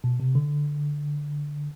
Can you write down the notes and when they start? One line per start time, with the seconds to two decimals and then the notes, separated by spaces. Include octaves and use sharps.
0.04 B2
0.20 C3
0.35 D3